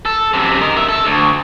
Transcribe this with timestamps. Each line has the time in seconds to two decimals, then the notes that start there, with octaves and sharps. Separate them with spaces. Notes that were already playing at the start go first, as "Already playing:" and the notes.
0.05 A4
0.34 F#2 C3
0.61 A#4 D#5
0.76 G2 E5
0.89 A4
1.05 D2